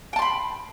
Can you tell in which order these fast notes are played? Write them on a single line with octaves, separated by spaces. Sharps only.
G5 A5 C6 B5